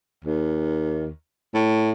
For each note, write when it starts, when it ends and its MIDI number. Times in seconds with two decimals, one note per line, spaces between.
0.25 1.09 39
1.55 1.92 45